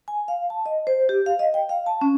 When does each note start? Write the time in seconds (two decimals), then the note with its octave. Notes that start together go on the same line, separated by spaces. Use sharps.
0.08 G#5
0.28 F5
0.50 A5
0.66 D#5
0.87 C5
1.09 G4
1.26 F5
1.39 D#5
1.54 G5
1.69 F5
1.86 A5
2.01 C#4